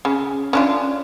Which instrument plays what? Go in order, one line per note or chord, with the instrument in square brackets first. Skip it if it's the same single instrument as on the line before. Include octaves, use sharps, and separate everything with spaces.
[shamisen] C#3
C#4 D4 F4